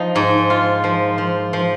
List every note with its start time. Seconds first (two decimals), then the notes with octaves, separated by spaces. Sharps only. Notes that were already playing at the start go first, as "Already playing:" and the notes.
Already playing: F3 D#4
0.16 G#2
0.50 F4
0.84 F3
1.18 F3
1.53 F3